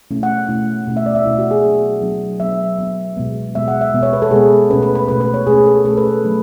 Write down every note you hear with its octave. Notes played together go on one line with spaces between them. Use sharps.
B2 A3 C#4 E4
F#5
B2 A3 C#4 E4
B2 A3 C#4 E4
E5
D5
E5
B2 A3 C#4 E4
F#4
G#4
F#3 B3 D4
F#3 B3 D4
F#3 B3 D4 E5
F#3 B3 D4
B2 G#3 B3
B2 G#3 B3 E5
F#5
E5
B2 G#3 B3
C#5
B4
A4
B2 G#3 B3 G#4
B2 A3 C#4 B4
B4
B4
B2 A3 C#4 B4
B4
C#5
B2 A3 C#4 G#4
A4
B2 A3 C#4 A4
B4
F#3 A3 D4